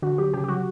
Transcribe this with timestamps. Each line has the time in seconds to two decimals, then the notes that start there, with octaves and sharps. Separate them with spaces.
0.02 D3 F#4
0.18 F#3 G4
0.34 C#3 G4
0.44 G4
0.49 F#3 F#4